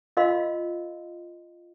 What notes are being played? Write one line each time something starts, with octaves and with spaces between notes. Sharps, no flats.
F4 A#4 D#5 F5 C6